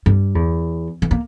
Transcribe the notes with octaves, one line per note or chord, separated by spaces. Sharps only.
G2
E2
E3
A#3